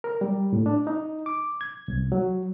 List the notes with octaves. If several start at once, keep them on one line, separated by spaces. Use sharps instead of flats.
A#4
G3
A2
D4
D#4
D6
G#6
C2
F#3